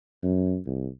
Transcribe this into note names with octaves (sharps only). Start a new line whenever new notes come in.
F#2
C2